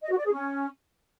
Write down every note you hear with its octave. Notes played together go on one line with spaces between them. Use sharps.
D#5
F#4
D5
G#4
C#4